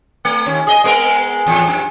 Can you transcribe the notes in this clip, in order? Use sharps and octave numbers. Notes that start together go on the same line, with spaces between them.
A3
D#2 C#4
G#4 D#5
G#3 B3 A#4
E2 A2
F#2